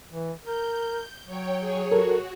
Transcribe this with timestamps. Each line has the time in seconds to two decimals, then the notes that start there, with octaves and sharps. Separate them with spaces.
0.11 E3
0.45 A#4 G6
1.26 F#3 C#5 G5
1.60 G#4 C#5
1.92 F#4 A4 A#4